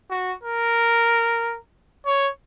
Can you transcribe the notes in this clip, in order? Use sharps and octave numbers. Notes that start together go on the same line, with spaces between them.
F#4
A#4
C#5